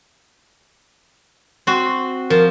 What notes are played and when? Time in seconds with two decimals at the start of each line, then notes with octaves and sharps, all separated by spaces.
1.67 C4 F#4
2.30 F3 A#4